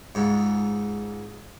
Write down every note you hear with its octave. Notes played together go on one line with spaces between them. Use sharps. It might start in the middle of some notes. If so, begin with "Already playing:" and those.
C#2 G#2